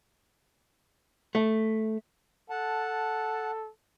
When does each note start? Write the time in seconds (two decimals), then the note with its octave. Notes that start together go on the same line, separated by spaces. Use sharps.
1.35 A3
2.50 A4 F#5 A5